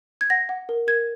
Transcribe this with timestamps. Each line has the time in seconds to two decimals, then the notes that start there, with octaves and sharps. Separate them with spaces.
0.21 G#6
0.30 F#5 A#6
0.49 F#5
0.69 A#4
0.87 A#4 G#6